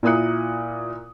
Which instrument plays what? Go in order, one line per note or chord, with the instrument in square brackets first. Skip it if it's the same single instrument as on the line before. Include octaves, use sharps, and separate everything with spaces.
[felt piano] A#2 E4 A#4 D#6 F#6 C#7